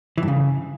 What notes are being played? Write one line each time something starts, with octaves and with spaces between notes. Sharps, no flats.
E3
G2
C#3